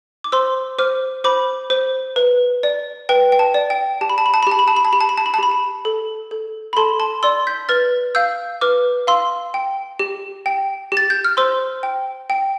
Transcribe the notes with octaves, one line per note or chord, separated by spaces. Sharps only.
D6
C5 C6 E6
C5 D6 F6
C5 B5 D6
C5
B4
D5
B4 G5
G5
A5
D5
G5
G4 A5
B5
A5
B5
A5
B5
G4 A5
B5
A5
B5
A5
G4 B5
A5
B5
A5
B5
A5
G4 B5
A5
A4
A4
B5
A4 A5 C6
A5 C6
D5 C6 E6
G6 B6
B4 F6 A6
F5 E6 G6
B4 D6 F6
F5 C6 E6
G5
G4
G5
G4
A6
G6
F6
C5 C6 E6
G5
G5